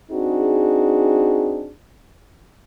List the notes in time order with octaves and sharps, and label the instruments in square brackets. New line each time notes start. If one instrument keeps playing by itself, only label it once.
[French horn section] C4 D4 D#4 F#4 G#4